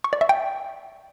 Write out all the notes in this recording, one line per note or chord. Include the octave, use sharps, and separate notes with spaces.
C#6
D5
E5
G5